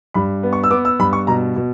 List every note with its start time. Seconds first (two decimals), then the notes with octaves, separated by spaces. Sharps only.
0.14 G2 B5
0.43 B3
0.53 C#6
0.63 E6
0.71 B3 D6
0.85 E6
0.99 G2 B5
1.13 C#6
1.27 B2 A#5
1.56 B2